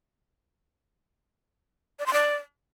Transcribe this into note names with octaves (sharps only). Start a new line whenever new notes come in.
D5
C6
D5